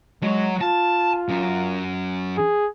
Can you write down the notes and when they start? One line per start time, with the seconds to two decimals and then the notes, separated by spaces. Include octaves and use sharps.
0.23 F#3 G#3 C#5
0.61 F4 A5
1.29 F#2
2.37 G#4